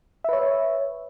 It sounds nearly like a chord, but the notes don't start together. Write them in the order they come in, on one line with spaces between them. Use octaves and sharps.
E5 B4 C#5